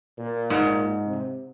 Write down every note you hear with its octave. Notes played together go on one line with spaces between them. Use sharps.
A#2
G#2
C3